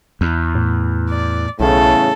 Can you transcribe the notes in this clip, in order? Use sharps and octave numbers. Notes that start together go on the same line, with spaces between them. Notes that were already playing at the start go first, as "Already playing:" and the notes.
E2
A2
D5
B1 E2 A2 C#3 A4